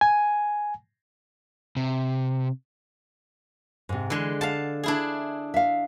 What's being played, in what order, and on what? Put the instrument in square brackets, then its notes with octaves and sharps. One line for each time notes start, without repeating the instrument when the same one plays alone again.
[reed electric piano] G#5
[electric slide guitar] C3
[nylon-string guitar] G#2 C3
[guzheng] D3 G#3 [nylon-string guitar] E3
[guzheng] F5 A5 [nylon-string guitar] F#5
[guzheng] D4 E4 G#4
[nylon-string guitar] E5 F5